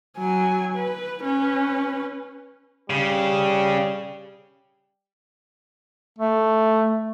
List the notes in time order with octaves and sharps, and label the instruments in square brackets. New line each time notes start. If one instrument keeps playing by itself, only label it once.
[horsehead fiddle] F#3 G#5
B4
C#4 B4
[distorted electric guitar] C#3 [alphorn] G3
[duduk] A3